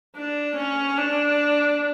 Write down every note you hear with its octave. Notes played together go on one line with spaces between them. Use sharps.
D4
C#4
D4